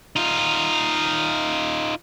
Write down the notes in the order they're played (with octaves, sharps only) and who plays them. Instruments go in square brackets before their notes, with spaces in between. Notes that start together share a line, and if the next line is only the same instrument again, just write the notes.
[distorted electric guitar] D#4 F4